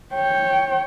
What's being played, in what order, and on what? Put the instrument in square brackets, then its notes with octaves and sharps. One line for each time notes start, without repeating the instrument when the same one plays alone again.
[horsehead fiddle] C#5 G5